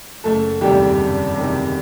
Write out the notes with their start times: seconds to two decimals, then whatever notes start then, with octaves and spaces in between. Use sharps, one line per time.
0.24 F#1 A3 A4
0.61 E2 C3 D#3 G3 G4
0.98 F#1
1.35 E2 C3 D#3